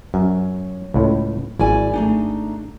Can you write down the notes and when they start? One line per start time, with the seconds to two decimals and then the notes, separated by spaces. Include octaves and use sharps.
0.14 F#2 C#5
0.94 C#2 A2
1.59 G#1 E4 D5 G#5
1.94 A3 D4 D#4